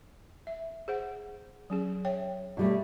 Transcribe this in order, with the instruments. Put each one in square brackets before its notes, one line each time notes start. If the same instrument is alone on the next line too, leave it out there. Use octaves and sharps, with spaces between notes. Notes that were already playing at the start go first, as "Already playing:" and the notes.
[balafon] E5
G#4 C5 F#5
F#3 C#4 G#4
C#5 E5 G5
[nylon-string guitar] B2 G3 A3